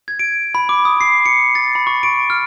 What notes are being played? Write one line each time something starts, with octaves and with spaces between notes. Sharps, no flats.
G#6
D7
B5
D6
D#6
C7
C#7
A6
B5
C#6
D7
F6